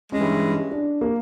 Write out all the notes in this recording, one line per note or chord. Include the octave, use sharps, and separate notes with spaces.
G2 E3 G#3 C#4
D4
A#3